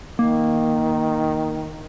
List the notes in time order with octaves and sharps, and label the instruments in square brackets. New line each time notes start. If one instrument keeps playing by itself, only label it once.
[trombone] D#3 [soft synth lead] A#3